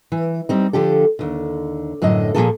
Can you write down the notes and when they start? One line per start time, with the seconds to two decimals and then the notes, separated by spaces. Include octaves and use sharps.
0.12 E3
0.49 G3 C4 D#4
0.73 D3 F3 G4 A4
1.19 D#2 D3
2.02 F#2 A2 D3 F#3 D#5
2.35 A#2 D3 F3 A#3 G#4 A4